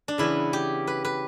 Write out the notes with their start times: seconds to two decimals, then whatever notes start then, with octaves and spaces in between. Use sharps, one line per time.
0.08 D4
0.18 C#3 E3 B3 E4
0.53 G4
0.87 B4
1.05 B4